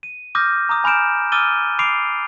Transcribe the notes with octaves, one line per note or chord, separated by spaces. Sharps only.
D#7
D6 D#6 F6 G6 A#6
A#5 D6 D#6
G#5 B5 F6 G6 D7 E7
D6 E6 F6 A6 D#7 G7
B5 D6 C7 D7 F7